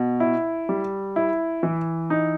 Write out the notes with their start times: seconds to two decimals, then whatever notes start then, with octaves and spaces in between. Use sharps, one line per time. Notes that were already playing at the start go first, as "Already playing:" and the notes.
Already playing: B2
0.20 E4
0.69 G3
1.16 E4
1.63 E3
2.10 D#4